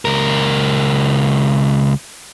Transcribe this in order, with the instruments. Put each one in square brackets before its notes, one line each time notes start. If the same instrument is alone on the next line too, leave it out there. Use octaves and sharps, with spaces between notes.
[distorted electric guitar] C#2 A#4